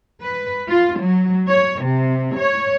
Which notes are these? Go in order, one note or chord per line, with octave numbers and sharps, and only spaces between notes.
B4
F4
F#3
C#5
C3
C#5